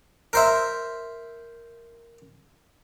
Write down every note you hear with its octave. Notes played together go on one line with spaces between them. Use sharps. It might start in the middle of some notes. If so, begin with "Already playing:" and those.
A#4 C5 E5